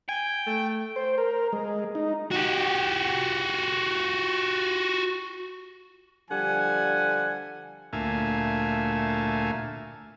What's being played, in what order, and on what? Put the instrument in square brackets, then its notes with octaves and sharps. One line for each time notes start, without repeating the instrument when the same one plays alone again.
[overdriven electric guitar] G5 [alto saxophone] G#5
[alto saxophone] A3
[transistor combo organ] C5
A#4
G#3
D#4
[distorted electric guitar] F#4 G4
[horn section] D3 F3 G3 F#5 G#5
[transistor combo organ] D2 A#2 A3 E5 F5 G#5